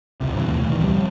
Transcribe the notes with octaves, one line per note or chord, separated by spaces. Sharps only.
C#2 C3
G2 C3 D#3 E3
D#2 B2 A3
B2 D#3 E3
F1 D2 C3 G3
F3 G3